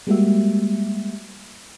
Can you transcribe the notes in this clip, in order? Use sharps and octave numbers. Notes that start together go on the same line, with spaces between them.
G3 G#3 A#3 F#4 G4 E5